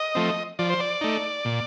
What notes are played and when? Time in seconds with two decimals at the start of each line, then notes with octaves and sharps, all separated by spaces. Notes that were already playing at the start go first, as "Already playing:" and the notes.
Already playing: D#5
0.15 F3 A3 C4
0.59 F3 D5
0.70 C5
0.80 D5
1.01 A3 D#4
1.45 A#2